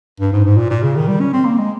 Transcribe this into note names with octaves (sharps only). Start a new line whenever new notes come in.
G2
G#2
G#2
A#2
A#2
C#3
D#3
G3
C#4
C4
A#3
G#3